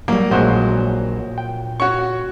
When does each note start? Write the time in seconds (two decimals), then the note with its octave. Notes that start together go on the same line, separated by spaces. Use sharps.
0.08 F#3 G3 A#3
0.31 A#1 A#2 F#3 G#3 F#4 C5 C#5
1.38 G5
1.80 F#4 C#5 C#6